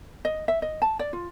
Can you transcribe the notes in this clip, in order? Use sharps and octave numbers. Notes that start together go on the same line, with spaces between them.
D#5
E5
D#5
A5
D5
F4